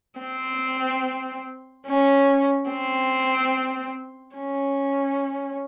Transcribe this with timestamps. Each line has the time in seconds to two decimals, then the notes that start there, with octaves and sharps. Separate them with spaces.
0.20 C4
1.86 C#4
2.70 C4
4.36 C#4